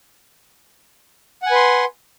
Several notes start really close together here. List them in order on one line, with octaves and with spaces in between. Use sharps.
F#5 G#5 B4 C6